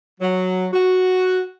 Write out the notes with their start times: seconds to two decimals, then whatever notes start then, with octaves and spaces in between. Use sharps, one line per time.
0.21 F#3
0.72 F#4